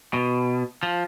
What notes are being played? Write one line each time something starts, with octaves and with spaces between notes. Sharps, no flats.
B2
F3